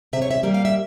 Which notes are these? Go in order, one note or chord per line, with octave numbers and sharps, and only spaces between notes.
C3 E5
C#5
E5
G3 A#3 E5
F5
E5